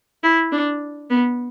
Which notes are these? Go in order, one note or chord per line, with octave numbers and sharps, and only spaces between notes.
E4
D4
B3